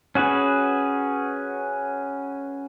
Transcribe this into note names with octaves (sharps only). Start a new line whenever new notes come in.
C#4 F#4 G#4 B4